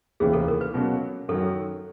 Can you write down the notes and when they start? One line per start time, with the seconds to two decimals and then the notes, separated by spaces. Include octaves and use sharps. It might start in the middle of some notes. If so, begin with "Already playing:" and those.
0.20 F1 D#2 C#3 E3 G#4
0.33 A4
0.48 A#4
0.61 B4
0.74 B2 F#3 A#3 C#4 F#4
1.28 F#2 D#3 F#3 A4